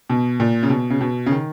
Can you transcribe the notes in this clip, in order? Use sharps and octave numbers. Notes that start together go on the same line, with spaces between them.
B2
A#2
C#3
B2
C#3
B2
C#3
D#3